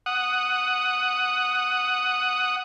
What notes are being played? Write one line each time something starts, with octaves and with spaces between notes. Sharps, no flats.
F#5 D#6